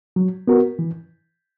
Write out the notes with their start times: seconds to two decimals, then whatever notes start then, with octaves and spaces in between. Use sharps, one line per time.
0.16 F#3
0.48 B3 F#4 A#4
0.79 E3